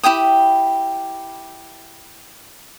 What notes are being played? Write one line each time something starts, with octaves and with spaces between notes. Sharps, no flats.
E4 G4 G5 D#6